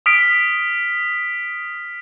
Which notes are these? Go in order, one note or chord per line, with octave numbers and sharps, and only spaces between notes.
D#6 F6 B6 D7